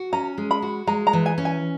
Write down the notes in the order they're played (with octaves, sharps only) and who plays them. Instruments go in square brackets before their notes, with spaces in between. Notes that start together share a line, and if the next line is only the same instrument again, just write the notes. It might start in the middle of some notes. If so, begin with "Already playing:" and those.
Already playing: [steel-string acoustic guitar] F#4
[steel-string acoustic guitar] C#4 [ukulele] A#5
[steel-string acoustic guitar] G#3
[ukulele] B5
[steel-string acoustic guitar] F#4
[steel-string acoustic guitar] G#3 [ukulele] A#5
[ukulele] A#5
[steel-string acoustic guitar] E3
[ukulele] G#5
[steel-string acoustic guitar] C#4
[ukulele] G#5